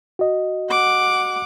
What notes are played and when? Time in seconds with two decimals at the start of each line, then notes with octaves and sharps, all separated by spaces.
0.19 F#4 D#5
0.70 F#5 D6